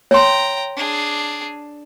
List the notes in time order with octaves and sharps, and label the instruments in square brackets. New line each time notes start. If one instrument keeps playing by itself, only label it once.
[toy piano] C#5 C6 [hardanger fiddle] G5 A#5
[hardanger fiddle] D4 G#4